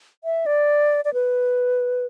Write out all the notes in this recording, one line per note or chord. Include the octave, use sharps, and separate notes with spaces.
E5
D5
D5
B4